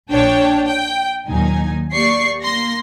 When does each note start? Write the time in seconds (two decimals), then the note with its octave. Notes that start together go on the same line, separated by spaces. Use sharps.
0.11 A#1 D4 C#5 G5 A5
0.66 G5
1.28 D#2 A#2 F#3 D#4 G#5
1.94 A#3 G4 D5 C#6 C7
2.43 A#3 C6 A#6